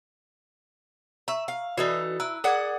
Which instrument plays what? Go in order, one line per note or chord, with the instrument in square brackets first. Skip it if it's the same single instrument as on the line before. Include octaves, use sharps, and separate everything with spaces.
[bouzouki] E5 [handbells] A#5 C#6
[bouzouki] F5
[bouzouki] E3 D#4 A4 [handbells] F#4 B4 D5
[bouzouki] E4 [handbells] A#5 E6 F#6
[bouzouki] G#4 D5 F#5 [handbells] A#4 D6 G#6